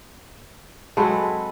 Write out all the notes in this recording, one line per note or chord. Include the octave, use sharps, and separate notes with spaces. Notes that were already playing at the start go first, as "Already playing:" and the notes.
F#3 G#3 C4 A4 B4 G#5